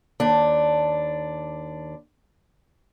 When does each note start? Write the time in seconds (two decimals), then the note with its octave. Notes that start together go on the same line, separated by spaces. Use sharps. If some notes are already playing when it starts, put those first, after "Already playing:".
0.20 D#2 D4